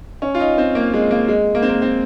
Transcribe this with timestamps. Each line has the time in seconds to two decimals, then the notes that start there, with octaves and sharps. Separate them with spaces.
0.22 C#4
0.35 F4
0.40 D#4
0.58 C4
0.75 A#3
0.94 G#3
1.11 A#3
1.28 G#3
1.55 A#3
1.62 C4
1.69 A#3
1.82 C4